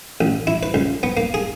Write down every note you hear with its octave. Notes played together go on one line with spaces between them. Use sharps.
A1
E4
B4
C#2
B3
A#3
G#4